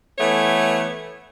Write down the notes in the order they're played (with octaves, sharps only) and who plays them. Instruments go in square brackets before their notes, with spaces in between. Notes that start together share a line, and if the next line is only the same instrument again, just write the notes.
[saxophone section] E3 A3 B3 C#5